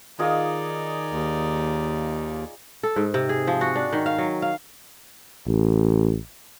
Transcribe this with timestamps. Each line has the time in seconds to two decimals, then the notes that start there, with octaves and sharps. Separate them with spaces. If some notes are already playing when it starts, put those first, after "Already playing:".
0.19 D#3 D#4 F4 G#4 D5 D#5
1.11 D#2
2.83 A4
2.96 G#2
3.14 C3
3.29 G#4
3.47 F3
3.61 F#4
3.76 D4
3.93 D#3
4.06 F5
4.18 F#3
4.42 F5
5.47 A1